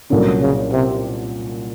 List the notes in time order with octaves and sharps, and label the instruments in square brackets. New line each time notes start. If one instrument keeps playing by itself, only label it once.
[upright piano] C2 A#2 F#3 A#3 C#4 [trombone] D3
[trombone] C#3
C3